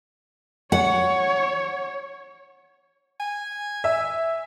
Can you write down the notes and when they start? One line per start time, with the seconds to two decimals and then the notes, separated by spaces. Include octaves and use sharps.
0.72 C#5 F#5
3.20 G#5
3.84 E5